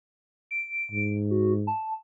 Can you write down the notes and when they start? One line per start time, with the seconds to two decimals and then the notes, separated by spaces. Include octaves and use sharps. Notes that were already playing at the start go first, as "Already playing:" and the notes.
0.51 D7
0.91 G#2
1.31 F#4
1.67 A5